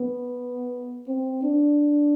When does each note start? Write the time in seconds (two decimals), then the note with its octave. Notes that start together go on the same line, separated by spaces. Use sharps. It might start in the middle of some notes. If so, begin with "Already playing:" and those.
Already playing: B3
1.08 C4
1.43 D4